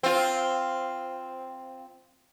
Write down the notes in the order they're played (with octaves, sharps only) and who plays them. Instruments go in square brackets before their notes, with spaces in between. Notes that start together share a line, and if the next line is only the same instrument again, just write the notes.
[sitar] C4 F4